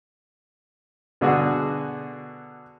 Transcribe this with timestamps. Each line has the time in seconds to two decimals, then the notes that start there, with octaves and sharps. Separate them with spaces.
1.21 B2 D3 F#4 G#4